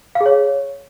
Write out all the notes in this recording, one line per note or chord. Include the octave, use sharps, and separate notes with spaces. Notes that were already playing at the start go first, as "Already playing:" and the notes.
F5
G#4
C#5